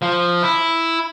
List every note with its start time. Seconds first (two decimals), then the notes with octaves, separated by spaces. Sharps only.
0.02 F3
0.43 E4